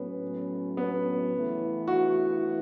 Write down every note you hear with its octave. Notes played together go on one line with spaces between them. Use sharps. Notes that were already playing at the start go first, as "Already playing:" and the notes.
Already playing: A2 F#3 B3 C#4
B3
C#3 E3 A3 E4
F#4